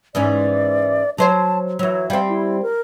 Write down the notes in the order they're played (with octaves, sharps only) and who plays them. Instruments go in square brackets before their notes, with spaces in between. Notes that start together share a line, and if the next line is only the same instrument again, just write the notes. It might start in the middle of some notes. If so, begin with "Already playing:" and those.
[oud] G#2 E3 C#4 [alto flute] D5
[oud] F#3 C5 C#5 [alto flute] A5
[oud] E3 F#3 [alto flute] C#5
[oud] G3 C4 [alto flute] F5
[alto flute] E4
A#4